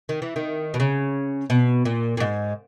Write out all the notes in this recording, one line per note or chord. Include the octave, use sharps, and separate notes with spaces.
D#3
E3
D#3
B2
C#3
B2
A#2
A#2
G#2